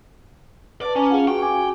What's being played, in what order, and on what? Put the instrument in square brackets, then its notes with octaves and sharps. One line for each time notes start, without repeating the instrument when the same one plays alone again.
[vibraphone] B4 A5 [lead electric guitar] D5
[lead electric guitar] C#4 [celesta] G#5 A#5 D6
[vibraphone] F4 [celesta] G#4 F5 F#5
[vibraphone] F#4 G#4 [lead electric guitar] G5 [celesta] C#6
[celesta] G#5 D6 G#6